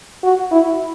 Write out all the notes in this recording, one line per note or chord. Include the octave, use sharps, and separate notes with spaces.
F#4
E4